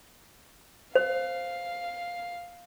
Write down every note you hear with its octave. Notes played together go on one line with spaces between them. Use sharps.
C5 F5